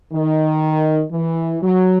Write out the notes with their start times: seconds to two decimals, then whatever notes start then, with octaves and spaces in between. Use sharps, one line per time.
0.13 D#3
1.12 E3
1.63 F#3